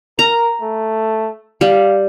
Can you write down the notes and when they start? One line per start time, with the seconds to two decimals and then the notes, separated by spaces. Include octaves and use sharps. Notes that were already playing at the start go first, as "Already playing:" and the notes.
0.19 A#4 A#5
0.61 A3
1.61 G3 F5